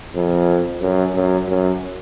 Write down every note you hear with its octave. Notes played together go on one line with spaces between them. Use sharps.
F2
F#2
F#2
F#2